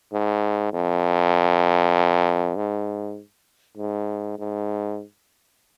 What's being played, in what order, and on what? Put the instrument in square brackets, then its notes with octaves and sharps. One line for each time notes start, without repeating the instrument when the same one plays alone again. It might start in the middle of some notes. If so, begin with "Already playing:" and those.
[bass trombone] G#2
F2
G#2
G#2
G#2